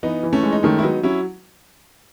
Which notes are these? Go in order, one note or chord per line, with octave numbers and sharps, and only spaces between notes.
E3 B3 D#4
E3
A3 C#4
G#3
D#4
D#3 A3 C#4
E4
F#3 B3 D#4
F#3 C#4 E4